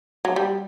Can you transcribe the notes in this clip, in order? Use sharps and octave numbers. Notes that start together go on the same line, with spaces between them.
F#3
G3